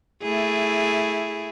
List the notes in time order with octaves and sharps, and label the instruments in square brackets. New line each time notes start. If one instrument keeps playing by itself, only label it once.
[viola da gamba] A3 E4 G#4